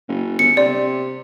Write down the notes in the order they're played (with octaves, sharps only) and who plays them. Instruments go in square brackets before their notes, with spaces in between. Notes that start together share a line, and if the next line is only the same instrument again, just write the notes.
[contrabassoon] F#1
[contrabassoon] G1 [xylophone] C#7
[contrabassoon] C3 [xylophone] D5